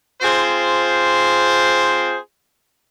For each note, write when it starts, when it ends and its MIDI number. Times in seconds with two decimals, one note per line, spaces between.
0.22 2.16 60
0.22 2.16 65
0.22 2.16 68
0.22 2.16 72